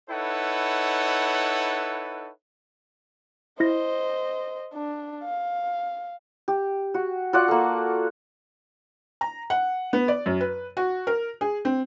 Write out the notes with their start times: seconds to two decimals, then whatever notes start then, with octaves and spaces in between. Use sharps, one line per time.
0.10 D#4 E4 A4 B4 C#5 F#5
3.60 E4 C5 D#5 A#6
4.74 D4
5.24 F5
6.48 G4
6.94 F#4
7.33 F4 F#4 D5 F#5
7.48 A#3 A4
9.21 A#5
9.50 F#5
9.93 B3
10.08 D5
10.26 F#2
10.41 B4
10.77 F#4
11.07 A#4
11.41 G#4
11.65 C4